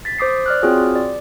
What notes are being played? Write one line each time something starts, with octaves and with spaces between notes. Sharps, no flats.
A6 B6
C5 D6 D#6 C7
D5 F6 F#6
C4 F4 F#4 G#4 C#5
D5